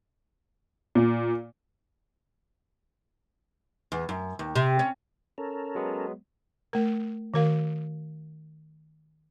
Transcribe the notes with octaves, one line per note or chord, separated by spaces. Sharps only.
A#2
E2
F#2
D#2
C3
C#4
C#4 A4 A#4
F#3 G#3 B3
A3 A#4
D#3 F#4 A#4 F5